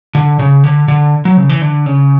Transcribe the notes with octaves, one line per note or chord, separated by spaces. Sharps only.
D3
C#3
D3
D3
F#3
C#3
E3
D3
C#3